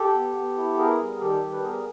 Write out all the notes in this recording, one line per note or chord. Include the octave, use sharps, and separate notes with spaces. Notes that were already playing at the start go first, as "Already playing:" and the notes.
Already playing: G4 A4
B3
B3
E4
B3 G#4 A#4
G3
D#3 G4 A4
G3
B4
B3 G#4 A#4